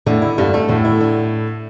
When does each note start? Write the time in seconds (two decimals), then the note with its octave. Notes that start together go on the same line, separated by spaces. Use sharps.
0.06 A2 D3
0.22 E4
0.38 G2 D3
0.54 A3
0.69 A2 D3
0.85 E4
1.01 D3